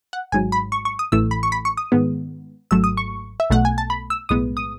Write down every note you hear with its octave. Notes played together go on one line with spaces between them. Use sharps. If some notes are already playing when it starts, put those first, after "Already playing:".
F#5
G#1 G#2 F#3 G#5
B5
C#6
C#6
D#6
A1 A2 E3 A3 E6
B5
C#6
B5
C#6
D#6
G#2 D#3 G#3 B3
G#1 G#2 F#3 A3 E6
D#6
C#6
E5
B1 B2 A3 F#5
G#5
A5
B5
E6
B1 A2 G#3 B3 D#6
D#6